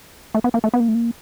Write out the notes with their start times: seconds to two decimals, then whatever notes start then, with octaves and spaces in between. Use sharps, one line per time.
0.35 A3
0.44 B3
0.54 A#3
0.64 A3
0.74 B3
0.80 A#3
0.88 A3
0.94 A#3